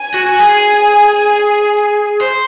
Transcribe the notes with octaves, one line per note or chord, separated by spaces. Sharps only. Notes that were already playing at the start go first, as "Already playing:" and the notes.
Already playing: G#5
F#4
G#4
C5